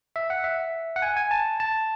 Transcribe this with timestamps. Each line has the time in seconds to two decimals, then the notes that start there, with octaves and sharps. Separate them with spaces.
0.16 E5
0.30 F#5
0.44 E5
0.96 F#5
1.02 G#5
1.17 G#5
1.31 A5
1.60 A5